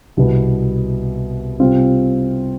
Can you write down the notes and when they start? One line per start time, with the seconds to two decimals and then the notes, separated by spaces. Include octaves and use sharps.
0.17 C2 B2 B3
1.60 C3 G3 C4 F4